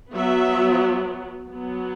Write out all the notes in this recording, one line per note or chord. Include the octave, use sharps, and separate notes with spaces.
F#3 B3 E5
F#3 B3